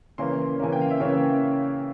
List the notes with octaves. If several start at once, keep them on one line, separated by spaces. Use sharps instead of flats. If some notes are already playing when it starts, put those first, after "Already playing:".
C#3 E3 A#3 C#4 C6
C#3 E3 A#3 C#4 G#5
G5
F5
E5
C#3 E3 A#3 C#5